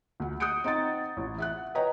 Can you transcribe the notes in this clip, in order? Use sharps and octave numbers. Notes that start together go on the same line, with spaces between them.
D2 F#5
D#6 F#6 G6 C#7 D7
C4 D#4 F#5 A6
A1
E5 F#5 F#6
B4 C#5 D#5 G5 A#5